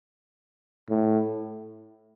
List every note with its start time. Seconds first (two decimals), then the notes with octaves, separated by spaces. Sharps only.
0.90 A2